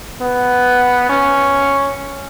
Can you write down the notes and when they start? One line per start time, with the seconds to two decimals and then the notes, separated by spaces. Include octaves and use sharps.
0.21 B3
1.09 C#4